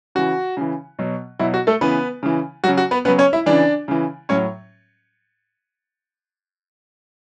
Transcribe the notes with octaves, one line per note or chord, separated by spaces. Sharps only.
C#3 E3 F#4
C#3 E3
B2 F#3
B2 F#3 E4
F#4
A3 A4
C#3 E3 B3 B4
C#3 E3
C#3 F#3 F#4
F#4
B3 B4
C#3 F#3 B3 B4
C#4 C#5
E4 E5
C#3 E3 D4 D5
C#3 E3
A2 F#3 C#4 C#5